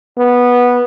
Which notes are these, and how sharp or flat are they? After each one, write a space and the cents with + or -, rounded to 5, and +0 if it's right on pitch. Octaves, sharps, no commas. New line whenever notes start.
B3 -10